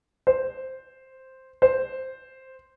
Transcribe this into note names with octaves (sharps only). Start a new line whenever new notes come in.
C5
C5